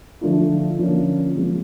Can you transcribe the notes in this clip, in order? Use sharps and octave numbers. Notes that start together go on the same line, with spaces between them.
D3 F3 A3 D4 F4
D3 F3 A#3 C#4
C3 F3 G#3